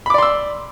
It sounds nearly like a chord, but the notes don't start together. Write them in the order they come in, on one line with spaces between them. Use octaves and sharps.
B5 D6 D5 C6 E6